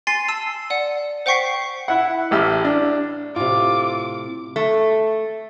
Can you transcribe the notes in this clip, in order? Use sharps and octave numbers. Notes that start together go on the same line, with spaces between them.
G#5 C6 A6 C7
A5 E6 C7
D5 F#5
C5 F#5 G5 C#6 B6 C7
E4 F#5
A1 G4 E6 F6
D4
A2 C3 F4 D6
A3